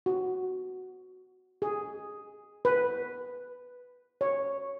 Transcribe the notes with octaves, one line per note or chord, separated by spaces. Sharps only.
F#4
G#4
B4
C#5